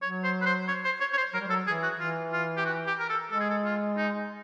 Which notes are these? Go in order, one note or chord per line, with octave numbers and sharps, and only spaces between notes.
F#3 C#5
C5
B4
C5
C#5
C5
C#5
C#5
C5
F#3 A#4
G3
F#3 A4
E3 G#4
F#4
E3 F4
F4
G4
F#4
G4
A#4
A4
G#3 A4
G#4
A4
F4
D#4